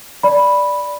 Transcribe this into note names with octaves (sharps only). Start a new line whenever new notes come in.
D5 B5